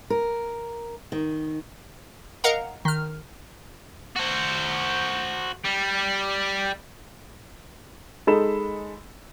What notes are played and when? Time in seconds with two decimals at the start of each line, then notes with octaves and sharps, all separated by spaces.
0.10 A#4
1.12 D#3
2.44 A#4 D#5 F5 F#5 A#5
2.85 D#3 F6
4.16 F#4 C5
5.65 G3
8.27 G#3 D#4 A4 B5 E7